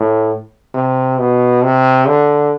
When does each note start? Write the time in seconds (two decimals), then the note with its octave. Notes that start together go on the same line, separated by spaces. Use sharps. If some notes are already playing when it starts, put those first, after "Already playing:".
Already playing: A2
0.74 C3
1.18 B2
1.63 C3
2.07 D3